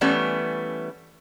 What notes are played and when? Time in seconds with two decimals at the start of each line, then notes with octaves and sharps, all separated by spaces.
0.01 E3 G3 A3 B3 C#4